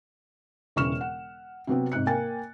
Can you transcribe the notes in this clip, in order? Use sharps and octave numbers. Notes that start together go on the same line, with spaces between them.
E1 C#3 E3 C#6 F6 E7
F#5
C3 F#3 B3 C4
G#2 C3 F#6 C#7
A#3 G5 G#5 A6